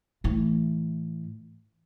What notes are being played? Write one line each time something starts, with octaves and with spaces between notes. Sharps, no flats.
A2 E3